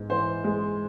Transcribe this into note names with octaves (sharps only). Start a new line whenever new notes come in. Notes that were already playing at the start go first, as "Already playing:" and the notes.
Already playing: G#2 B3
E3 C5
G#3